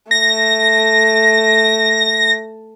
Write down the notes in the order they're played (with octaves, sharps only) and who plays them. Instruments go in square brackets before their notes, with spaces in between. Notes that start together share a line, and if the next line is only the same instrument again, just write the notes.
[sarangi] A3 [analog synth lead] A#6